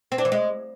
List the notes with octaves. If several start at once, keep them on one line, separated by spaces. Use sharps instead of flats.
C4
D4
E3
G#3